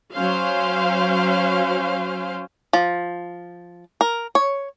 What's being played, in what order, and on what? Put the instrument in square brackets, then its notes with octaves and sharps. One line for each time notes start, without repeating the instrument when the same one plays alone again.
[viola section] F#3 C#4 C5 F5
[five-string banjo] F3
A#4
C#5